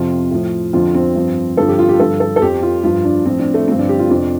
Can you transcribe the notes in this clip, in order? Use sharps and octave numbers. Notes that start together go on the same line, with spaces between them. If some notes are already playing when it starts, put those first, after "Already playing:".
Already playing: F2 C3 F3 F4
A2 F3
F2 D3 F3 F4
C4
G2 F3
G2 D3 F3 A4
G4
F4
G4
G2 D3 F3 A4
A4
A4
F2 F3 G4
F4
G2 F3 F4
D4
A2 F3 C4
D4
A3
G2 D3 F3 C4
D4
G4
F4
F2 C3 F3 D4